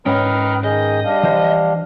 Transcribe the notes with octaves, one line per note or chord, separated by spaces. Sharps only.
G#2 C#4 B4 D#5 G5 D#6 F6
D#3 G#4 D#5 G6
G3 D4 F5
E3 F3 C5